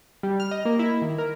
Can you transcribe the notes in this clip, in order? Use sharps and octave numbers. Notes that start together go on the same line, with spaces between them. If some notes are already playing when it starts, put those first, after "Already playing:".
G3
F6
D#5
A#3
E4
D#3
A#4